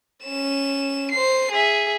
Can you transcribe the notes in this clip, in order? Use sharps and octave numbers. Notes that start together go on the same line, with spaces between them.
C#4 E7
C5 C7
G#4 E5